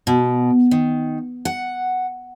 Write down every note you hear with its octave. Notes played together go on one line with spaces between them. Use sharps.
B2
D#3
F#5